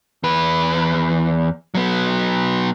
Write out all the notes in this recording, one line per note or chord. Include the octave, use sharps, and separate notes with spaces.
E2 B4
F#3 B3